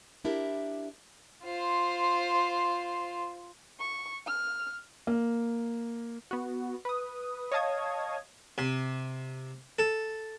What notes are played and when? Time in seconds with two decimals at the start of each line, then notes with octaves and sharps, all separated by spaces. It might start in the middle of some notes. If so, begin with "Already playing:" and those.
0.24 D4 E4 G4 A#4
1.44 F4 C5
3.79 C#6
4.27 F6
5.07 A#3
6.31 B3 F#4
6.85 B4 D#6
7.52 C#5 D#5 F5 A5 D#6 G#6
8.58 C3
9.79 A4